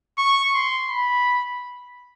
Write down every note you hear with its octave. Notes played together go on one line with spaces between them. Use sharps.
C#6
C6
B5